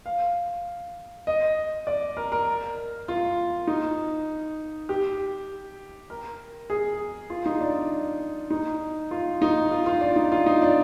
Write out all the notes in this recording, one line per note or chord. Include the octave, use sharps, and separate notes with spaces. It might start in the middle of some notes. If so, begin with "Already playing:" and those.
F5
D#5
D5
A#4
A#4
F4
D#4
G4
A#4
G#4
F4
D#4
D4
D#4
F4
D#4
F4
F4
D4
D#4
F4
D#4
D4